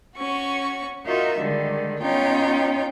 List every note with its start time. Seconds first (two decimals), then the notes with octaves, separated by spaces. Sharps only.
0.16 C#4 F#4 C#6
1.06 D#4 F4 F#4 A#4 E5
1.38 D3 D#3 G3 G#3
2.01 B3 C#4 D#4 F4 C#5 G5